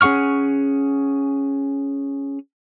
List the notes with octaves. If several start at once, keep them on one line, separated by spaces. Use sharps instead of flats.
C#4 G#4 F#5 C#6 F6